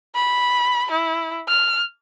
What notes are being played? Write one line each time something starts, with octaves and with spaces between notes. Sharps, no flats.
B5
E4
F6